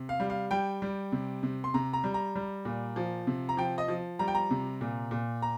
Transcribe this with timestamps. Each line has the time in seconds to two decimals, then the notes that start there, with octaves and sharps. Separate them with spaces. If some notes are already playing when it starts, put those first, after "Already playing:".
Already playing: C3
0.09 F5
0.20 G3
0.30 F5
0.51 G3 G5
0.82 G3
1.12 C3
1.43 C3
1.64 C6
1.74 C3 A#5
1.93 A#5
2.04 G3
2.14 A#5
2.36 G3
2.65 A#2
2.96 F3
3.27 C3
3.49 A#5
3.57 F3 G5
3.78 D#5
3.88 F3
4.19 G3 A#5
4.28 G5
4.35 A#5
4.50 C3
4.81 A#2
5.11 A#2
5.42 A#5